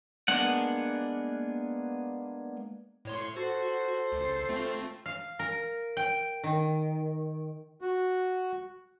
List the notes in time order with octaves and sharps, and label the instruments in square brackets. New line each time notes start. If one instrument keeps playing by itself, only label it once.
[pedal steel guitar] G#3 A#3 B3 D4 F#5
[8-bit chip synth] A2 C#5 C6
[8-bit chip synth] F#4 [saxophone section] A4 C5
[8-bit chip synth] C#2
A3 C4 F4
[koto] F5
A#4
G5
D#3
[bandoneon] F#4